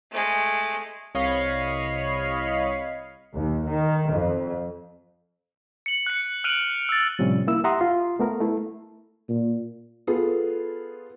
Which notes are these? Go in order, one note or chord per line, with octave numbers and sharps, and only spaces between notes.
G#3 A3
C2 C#5 D#5 F5 B5 C7
D#2
D#3
F2
C#7 F#7
F#6 C#7
F6 F#6 D7 D#7 F7 F#7
E6 A6
A2 C3 F3 G3 C#4
A#3 E4 E6
G4 E5 F#5 A#5 C6 D#6
F4 C6
A3 B3 A#4
A3 E4
A#2
B3 F4 G#4 A4